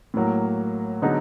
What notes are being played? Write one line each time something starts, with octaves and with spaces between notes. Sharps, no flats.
A2 F#3 A#3
D3 F#3 B3 D#4 G#4